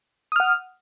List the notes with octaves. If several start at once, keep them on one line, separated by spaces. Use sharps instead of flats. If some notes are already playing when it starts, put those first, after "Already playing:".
F#5 D#6 F6